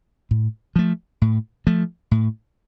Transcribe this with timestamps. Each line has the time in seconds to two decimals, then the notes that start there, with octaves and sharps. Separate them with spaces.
0.31 A2
0.76 F3 A3
1.22 A2
1.67 F3 A3
2.11 A2